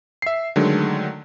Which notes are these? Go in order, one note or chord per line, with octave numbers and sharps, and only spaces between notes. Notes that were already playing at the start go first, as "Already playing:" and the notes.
E5 C7
D3 D#3 F#3 G#3 A3